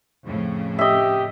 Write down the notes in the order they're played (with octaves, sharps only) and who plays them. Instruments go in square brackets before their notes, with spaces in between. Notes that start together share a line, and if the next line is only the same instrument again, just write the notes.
[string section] F2 A2 C#3
[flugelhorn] G4 [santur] D#5 E5